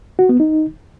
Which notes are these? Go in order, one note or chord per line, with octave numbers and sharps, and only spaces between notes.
F#4
B3
D#4